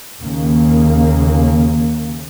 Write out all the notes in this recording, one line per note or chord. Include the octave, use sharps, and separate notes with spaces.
D#2 C#3 A#3